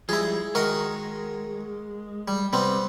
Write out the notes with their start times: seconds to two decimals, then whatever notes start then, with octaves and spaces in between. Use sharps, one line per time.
0.09 F3 G3 G#3 E4 G#4
0.55 D#3 G#3 F#4 A#4
2.28 G3
2.53 C3 G3 B3 C4